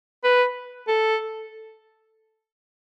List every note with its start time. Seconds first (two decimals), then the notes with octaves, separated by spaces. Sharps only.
0.24 B4
0.88 A4